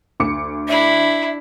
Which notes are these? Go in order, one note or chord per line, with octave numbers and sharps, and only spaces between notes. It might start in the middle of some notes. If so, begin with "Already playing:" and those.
D2 D6 C#7
D4 E4 E5